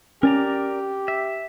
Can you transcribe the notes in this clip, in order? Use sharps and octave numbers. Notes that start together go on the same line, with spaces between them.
C#4 G4 A#4 D5 A#5
E5